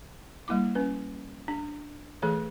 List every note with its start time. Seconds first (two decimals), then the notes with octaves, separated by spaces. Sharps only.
0.48 G3 A#3 E4 D6
0.75 C#4 B4
1.48 D4
2.22 E3 A3 G#4 A4 B4 C#5